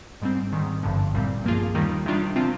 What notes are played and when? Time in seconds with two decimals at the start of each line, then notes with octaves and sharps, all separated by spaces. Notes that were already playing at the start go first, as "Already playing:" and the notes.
0.22 G#2 G3 C4
0.52 G#2 D#3 G3
0.83 G1 G2 D3 F3
1.14 C2 A#2 G3 C4
1.44 G2 F3 A#3 F4 G#4
1.75 D#2 D#3 G3 A#3 D#4
2.06 C3 D#3 G3 D4 F4
2.36 C3 F3 C4 F4